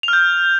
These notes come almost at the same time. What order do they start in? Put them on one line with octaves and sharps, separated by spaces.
F7 F6 G6